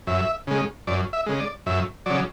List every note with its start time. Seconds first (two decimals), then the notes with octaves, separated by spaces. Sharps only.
0.07 F#2 E5
0.47 C#3 G#3
0.87 F#2 D5
1.13 E5
1.26 C#3 G#3
1.40 D5
1.66 F#2 E5
2.06 C#3 F#3 D5